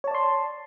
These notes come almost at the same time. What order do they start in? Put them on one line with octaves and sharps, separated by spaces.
C#5 A5 D5 C6